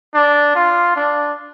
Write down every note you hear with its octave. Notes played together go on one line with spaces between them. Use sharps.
D4
F4
D4